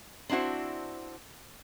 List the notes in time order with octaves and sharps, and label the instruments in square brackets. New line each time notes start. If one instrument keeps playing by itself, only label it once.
[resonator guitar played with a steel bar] C4 D4 E4 F#4 C5